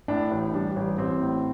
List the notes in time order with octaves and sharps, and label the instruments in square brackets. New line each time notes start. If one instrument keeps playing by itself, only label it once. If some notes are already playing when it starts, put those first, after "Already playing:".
[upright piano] A2 D4
A1
G3 D4
A1
A1 C4
A2